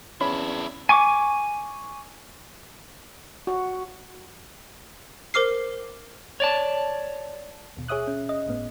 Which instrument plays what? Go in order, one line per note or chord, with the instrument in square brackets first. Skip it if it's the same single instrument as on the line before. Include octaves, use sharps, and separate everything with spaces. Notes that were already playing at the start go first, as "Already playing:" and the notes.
[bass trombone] E2 [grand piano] C#4 [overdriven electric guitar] D4 E4 [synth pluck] B5
[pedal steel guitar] G#5 C#6 D6
[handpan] F#4
[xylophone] A#4 C5 D6 F6 C7
[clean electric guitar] C#5 D5 A5
[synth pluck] D#2 B2
G#4 C#5 E5 D#6 F#6
C#4
D#5
G1 A2 B3